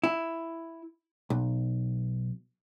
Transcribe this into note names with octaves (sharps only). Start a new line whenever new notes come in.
E4
B1